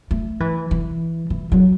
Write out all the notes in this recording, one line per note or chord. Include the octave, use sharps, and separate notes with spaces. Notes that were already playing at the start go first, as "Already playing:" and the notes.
A3
E3
E3
E3
F#3